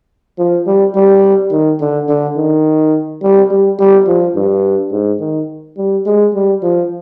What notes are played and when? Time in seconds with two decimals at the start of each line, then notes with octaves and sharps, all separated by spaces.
0.38 F3
0.67 G3
0.95 G3
1.52 D#3
1.81 D3
2.09 D3
2.37 D#3
3.22 G3
3.51 G3
3.79 G3
4.07 F3
4.36 G2
4.92 G#2
5.20 D#3
5.77 G3
6.06 G#3
6.34 G3
6.63 F3